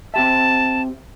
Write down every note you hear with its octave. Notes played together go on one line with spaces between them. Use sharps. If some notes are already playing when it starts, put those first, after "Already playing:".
C4 G4 E5 A5